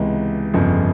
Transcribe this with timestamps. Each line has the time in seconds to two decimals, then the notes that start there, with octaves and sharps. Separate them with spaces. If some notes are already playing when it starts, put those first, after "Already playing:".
Already playing: C#2 C3 E3 G#3 B3
0.54 G1 F2 C#3 F3